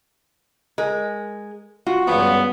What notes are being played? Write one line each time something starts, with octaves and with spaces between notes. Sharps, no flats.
G#3 A#4
F4 F#4
C#2 G2 F3 B3 F#5